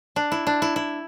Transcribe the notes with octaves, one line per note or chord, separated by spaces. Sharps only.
D4
E4
D4
E4
E4